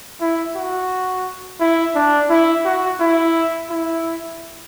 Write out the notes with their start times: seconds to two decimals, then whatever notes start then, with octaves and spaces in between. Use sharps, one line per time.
0.21 E4
0.56 F#4
1.60 E4
1.95 D4
2.30 E4
2.65 F#4
3.00 E4
3.70 E4